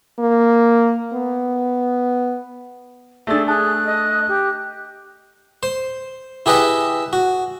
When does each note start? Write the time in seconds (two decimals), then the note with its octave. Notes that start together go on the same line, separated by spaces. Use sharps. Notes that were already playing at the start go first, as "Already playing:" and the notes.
0.20 A#3
1.13 B3
3.27 A3 D4 G#4 A4 D5 E5 A6
3.48 G#4 G#5 A5 F#6
3.86 D#5
4.28 G4
5.63 C5
6.46 E4 G4 G#4 B4 D#5 E5
7.13 F#4